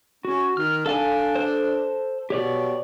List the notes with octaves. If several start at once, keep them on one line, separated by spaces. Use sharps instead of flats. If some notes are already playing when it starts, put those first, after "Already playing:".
C#4 F#4
D#3 F6
D4 A4 F5 G#5
A4 C5
B2 G4 C#5 D5